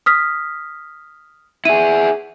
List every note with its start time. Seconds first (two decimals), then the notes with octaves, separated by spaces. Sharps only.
0.06 D#6 F6 B6
1.65 E4 G#4 D#7